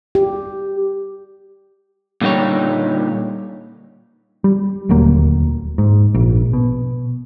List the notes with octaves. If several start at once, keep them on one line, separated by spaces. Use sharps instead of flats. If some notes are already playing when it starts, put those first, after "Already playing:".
G4
A#2 D3 G3 D#4 G4 C#5
G3
D#1 D2 F#3 A#3
G#2
A#1
B2